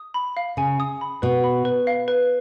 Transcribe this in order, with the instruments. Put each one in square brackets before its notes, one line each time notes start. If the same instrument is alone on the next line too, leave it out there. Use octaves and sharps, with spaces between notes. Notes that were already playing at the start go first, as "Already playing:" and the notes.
Already playing: [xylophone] D#6
B5
F5
[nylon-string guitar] C#3 [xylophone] G#5
[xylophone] D#6
B5
[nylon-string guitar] B2 [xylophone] B4
[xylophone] B5
B4
F5
B4